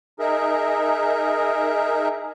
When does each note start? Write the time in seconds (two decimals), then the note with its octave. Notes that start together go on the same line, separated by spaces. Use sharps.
0.20 D#4 G#4 A#4 E5